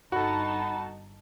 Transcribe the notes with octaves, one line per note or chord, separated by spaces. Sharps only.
G1 D#4 F#4 A4 A5 B5